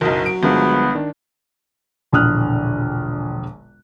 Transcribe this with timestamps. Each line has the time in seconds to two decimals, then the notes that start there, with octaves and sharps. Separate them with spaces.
0.01 F#1 B1 F#3 A#4 D#5 D#6
0.26 D7
0.43 G1 G2 F3 G#3 B3 A#4
0.95 D#3 D4
2.12 E1 A#1 D3 D#6 F6 F#6